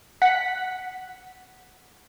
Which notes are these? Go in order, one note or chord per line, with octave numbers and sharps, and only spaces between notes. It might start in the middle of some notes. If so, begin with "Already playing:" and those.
F#5 B6